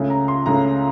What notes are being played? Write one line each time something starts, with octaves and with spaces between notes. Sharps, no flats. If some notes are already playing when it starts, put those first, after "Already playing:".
Already playing: C#2 C#3 A3 C#4
A#5
C6
C#2 C#3 A3 C#4 A#5